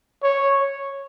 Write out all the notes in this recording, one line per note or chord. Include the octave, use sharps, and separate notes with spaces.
C#5